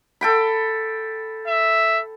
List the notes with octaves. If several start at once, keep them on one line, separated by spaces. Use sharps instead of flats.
A4 G5 B5
E5